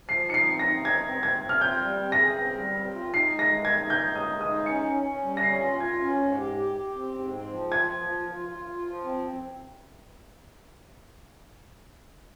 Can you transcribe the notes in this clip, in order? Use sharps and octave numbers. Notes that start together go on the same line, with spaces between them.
F3 C7
D#4 C#7
C7
C4
A#6
D#4
C4 G#6
C4
C4 G#6
C4
F6
F4 G6
G3
C4
A#6
G#4
C4
G3
C4
F4
D#4 C7
G#3
A#6
D#3
G#6
D#4
D#4 G6
G#3
D#6
G#3
D#6
D#4
C#4 C#7
C#4
C#4
G3
A#6
C#4 C7
F4
F4 G#6
C#4
G#2
G4
G4
G4
C4
G#2
C4
F3
F4 G#6
F3
F4
F4
F4
F4
F3
C4